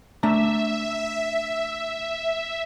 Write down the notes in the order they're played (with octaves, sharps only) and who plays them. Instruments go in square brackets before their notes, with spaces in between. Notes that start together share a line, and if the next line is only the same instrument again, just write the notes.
[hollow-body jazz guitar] A3 D4 A#5 [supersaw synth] E5